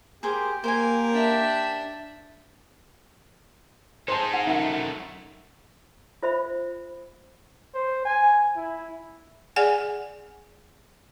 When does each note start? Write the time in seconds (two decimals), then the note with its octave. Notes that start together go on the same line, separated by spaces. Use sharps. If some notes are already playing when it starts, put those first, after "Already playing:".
0.23 G4 G#4 A#4 C5
0.64 A#3 A#4 C5 G#5
1.13 D4 E5
4.08 G#3 D#4 C5 A5
4.34 F#5
4.47 F#2 A3 D#4 E5 F#5
6.23 F4 C5 E5 B5
7.74 C5
8.05 G#5
8.56 E4
9.56 G#4 D5 F#5 G#5